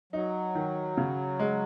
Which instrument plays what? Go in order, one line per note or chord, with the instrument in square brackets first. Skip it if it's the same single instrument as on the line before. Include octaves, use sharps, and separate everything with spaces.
[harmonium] F#3 [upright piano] D#4
[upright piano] D#3
C#3
G#3